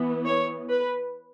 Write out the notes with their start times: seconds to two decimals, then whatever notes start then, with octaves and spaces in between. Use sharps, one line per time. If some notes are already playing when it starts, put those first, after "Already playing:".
Already playing: E3 B3
0.25 C#5
0.69 B4